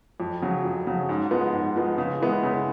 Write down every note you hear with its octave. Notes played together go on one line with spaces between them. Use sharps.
F2
C#3 F#3
F2
C#3 F#3
G#2
F3 G#3 B3
G#2
F3 G#3 B3
C#3
E3 G#3 B3 E4
C#3